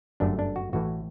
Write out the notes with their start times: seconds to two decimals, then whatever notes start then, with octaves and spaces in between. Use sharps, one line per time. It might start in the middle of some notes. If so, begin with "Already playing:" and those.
0.20 G1 F#2 D3 A3 D4
0.39 D4
0.56 F#4
0.73 A1 A2 E3 F#4